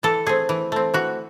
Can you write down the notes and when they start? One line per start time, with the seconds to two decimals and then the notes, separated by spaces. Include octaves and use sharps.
0.03 E3 A4
0.26 A3 C4 G#4
0.49 E3
0.72 A3 C4
0.94 E3 F#4